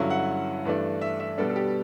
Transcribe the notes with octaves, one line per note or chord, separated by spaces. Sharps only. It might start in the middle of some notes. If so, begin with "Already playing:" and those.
Already playing: G2 D3 F#3 C#4 E4
F#5
G2 E3 A3 D4
E5
E5
B2 G3 B3 D4 A4
A4
G4